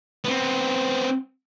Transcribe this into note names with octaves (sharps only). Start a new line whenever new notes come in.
B3 C4